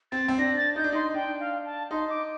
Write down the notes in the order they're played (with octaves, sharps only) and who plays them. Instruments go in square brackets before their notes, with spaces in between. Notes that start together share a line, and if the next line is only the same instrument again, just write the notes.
[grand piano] C4 [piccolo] A6
[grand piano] C4
[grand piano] D4 [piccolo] A#6
[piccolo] A6
[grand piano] D#4 [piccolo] G6
[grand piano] D4
[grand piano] D#4 [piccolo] C6
[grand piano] D4 [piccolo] G5
[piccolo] F5
A5
[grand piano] D#4 [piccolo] C6
[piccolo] D6